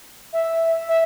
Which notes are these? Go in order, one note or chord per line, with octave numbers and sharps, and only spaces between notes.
E5
E5